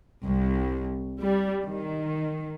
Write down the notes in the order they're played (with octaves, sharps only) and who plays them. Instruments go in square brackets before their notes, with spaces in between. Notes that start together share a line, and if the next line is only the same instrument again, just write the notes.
[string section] C2
G3
D#3